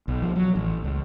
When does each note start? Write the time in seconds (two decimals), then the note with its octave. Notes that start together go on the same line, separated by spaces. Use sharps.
0.08 B1
0.22 F3
0.36 F#3
0.55 A1
0.84 C#2